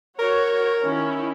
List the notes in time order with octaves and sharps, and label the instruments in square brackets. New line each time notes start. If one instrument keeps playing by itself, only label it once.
[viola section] F#4 C#5 [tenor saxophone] A#4
[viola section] D#3 C#4 E4